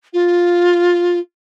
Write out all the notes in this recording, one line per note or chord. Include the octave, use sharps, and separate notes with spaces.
F4